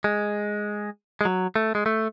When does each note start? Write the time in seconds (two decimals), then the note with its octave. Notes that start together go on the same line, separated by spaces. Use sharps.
0.04 G#3
1.21 G#3
1.25 F#3
1.56 A3
1.75 G#3
1.86 A3